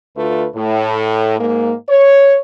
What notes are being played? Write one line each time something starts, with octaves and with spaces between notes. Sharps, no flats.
D2 D3 A3 F4 B4
A2
G#2 A#3
C#5